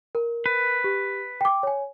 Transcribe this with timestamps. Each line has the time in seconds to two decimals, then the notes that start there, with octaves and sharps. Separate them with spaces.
0.15 A#4
0.46 B4
0.84 G4
1.41 G5 D6
1.63 C#5 G#5